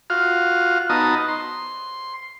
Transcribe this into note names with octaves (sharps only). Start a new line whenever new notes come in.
F4 F#4 F5
B3 D#4 F#4 D#5 A5 A#5
C6